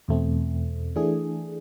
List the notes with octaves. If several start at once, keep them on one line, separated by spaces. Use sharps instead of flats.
E2 B2 A3 C4
E3 A3 D4 G#4